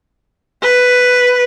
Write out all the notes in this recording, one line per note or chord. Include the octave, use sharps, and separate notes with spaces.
B4